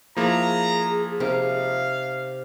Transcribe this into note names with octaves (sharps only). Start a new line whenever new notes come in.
F3 A#3 E4 G#4 A#5
C3 D#4 A#4 F5